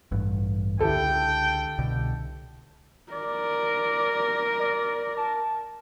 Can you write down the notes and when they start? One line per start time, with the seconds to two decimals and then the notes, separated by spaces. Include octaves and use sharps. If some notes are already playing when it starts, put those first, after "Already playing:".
0.11 A1 G2
0.81 C#2 D3 E4 G4 A4 G5
1.78 C2 B2 D3
3.13 A#4 D5
4.59 D5
5.17 A5